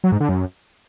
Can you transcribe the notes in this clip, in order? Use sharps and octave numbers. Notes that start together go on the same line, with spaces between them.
F#3
G#2
D3
F#2